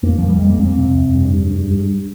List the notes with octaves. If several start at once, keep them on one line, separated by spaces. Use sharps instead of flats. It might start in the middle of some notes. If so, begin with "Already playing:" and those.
F2 A#3
F2 F3
G3
F2 G#3
A#3
F2 C4
C3
F2
G2
G2
G2
G2